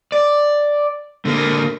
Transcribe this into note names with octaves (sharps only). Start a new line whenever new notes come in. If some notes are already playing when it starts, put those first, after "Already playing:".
D5
D3 A#3